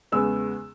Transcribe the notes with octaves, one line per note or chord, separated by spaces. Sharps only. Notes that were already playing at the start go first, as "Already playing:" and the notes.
E2 C#3 G#3 B3 E6